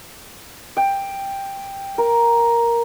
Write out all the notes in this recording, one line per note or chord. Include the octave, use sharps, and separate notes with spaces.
G5
A#4